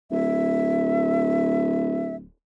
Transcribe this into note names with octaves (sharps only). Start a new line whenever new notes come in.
D1 E5